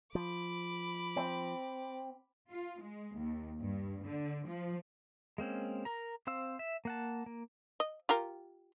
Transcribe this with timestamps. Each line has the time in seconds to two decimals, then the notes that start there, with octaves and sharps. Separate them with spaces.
0.15 F3 B5 D6
1.16 C4
2.51 F4
2.81 G#3
3.16 D#2
3.59 G2
4.04 D3
4.46 F3
5.38 G#3 A#3 C4 C#4
5.85 A#4 A#5
6.27 C4 C5 F5 E6
6.59 E5
6.85 A#3 F#5 A5
7.26 A#3
7.80 D#5
8.09 F4 G4 A#4